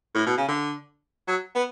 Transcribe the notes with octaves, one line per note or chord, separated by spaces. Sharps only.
A2
B2
C#3
D3
F#3
B3